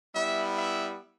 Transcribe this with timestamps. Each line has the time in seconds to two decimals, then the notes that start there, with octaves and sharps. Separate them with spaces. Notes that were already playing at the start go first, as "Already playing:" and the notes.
0.14 G3 B3 E4 E5
0.57 E5